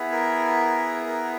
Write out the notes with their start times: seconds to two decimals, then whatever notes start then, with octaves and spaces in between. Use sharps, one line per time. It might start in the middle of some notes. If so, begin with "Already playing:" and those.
Already playing: B3 E4 G#4
0.12 A#4
1.07 A#4